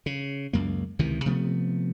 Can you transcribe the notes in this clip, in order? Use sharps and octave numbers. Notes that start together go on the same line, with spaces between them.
C#3
C#2 F#2 A#3
C#2 C3 D#3 E3
C3 F3 A3 B3